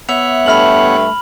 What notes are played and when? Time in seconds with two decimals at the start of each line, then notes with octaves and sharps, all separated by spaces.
0.09 B3 C#5 E5 F#5 F7
0.46 G2 A3 B5 F6 F#7